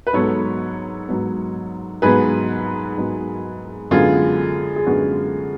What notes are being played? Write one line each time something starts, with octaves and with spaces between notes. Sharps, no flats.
B4
G#2 F#3 B3 A4 C#5
G#2 F#3 B3
G#2 F#3 B3 G#4 B4
G#2 F#3 B3
F#2 D3 G#3 B3 F4 G#4
G#4
F#2 D3 G#3 B3 F#4